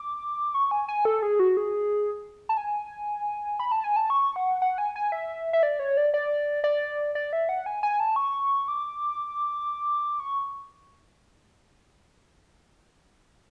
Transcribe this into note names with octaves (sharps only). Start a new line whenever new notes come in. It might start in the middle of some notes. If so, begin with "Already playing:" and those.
Already playing: D6
C#6
G#5
G#5
A4
G#4
F#4
G#4
A5
G#5
B5
A5
G#5
A5
C#6
F#5
F#5
G#5
G#5
E5
E5
D5
C#5
D5
D5
D5
D5
E5
F#5
G#5
G#5
A5
C#6
D6
C#6